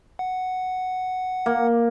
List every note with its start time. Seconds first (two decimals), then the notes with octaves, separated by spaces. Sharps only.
0.19 F#5
1.46 A#3